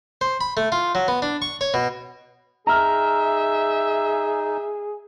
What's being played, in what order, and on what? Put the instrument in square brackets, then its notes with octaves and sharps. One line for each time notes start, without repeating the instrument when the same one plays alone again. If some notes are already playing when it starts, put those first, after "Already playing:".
[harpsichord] C5
B5
A3
F4
F#3
B3
D4
C#6
C#5
B2
[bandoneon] D#4 [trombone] G#4 [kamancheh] E5 [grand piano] A#5 F6